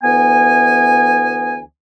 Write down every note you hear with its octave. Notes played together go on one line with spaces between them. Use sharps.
D2 E3 B3 G#5